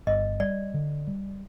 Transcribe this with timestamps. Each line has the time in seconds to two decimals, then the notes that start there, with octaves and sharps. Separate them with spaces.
0.07 G1 D#5
0.40 G3 D5
0.74 D3
1.07 G3